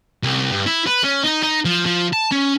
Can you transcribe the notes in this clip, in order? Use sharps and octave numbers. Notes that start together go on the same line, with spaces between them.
C2
G2
E4
B4
C#4
D#4
D#4
F3
F3
A5
C#4